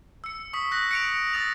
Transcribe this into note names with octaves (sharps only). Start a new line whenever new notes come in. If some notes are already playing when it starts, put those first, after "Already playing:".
E6 C#7
C#6 D#6 B6
F#6 A#6
C#7 D7 F7
D#6 A6 F7